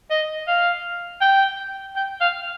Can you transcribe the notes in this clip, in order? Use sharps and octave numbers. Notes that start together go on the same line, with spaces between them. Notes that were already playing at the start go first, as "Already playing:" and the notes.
D#5
F5
G5
G5
F5